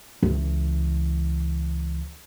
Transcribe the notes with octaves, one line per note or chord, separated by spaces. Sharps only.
C#2 E3